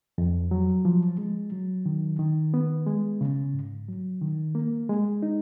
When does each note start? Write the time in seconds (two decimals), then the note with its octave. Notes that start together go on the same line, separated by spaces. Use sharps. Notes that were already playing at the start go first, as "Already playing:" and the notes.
0.18 F2
0.51 F#3
0.85 F3
1.18 G#3
1.52 F#3
1.86 D#3
2.19 D#3
2.54 B3
2.87 G#3
3.21 C#3
3.54 G#2
3.89 F#3
4.21 D#3
4.55 A#3
4.89 G#3
5.23 D#4